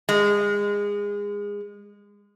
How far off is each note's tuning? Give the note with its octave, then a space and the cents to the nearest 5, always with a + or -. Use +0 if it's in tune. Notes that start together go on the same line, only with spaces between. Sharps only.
G#3 -25